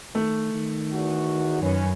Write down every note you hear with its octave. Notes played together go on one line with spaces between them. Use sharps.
D#3 A3
D#3
E2 F#4
F#2 C#4 B4